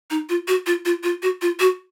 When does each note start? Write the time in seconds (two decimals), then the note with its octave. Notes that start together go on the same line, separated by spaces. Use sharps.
0.10 D#4
0.29 F4
0.48 F#4
0.66 F4
0.85 F4
1.03 F4
1.22 F#4
1.42 F4
1.60 F#4